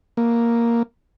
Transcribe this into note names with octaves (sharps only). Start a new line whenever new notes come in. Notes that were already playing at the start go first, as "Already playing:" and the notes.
A#3